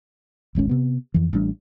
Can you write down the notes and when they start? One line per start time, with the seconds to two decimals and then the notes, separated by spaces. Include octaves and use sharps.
0.55 D#1 G#1 G#3 C#4
0.69 C3 B3
1.14 F2 E3
1.33 A1 G3 D4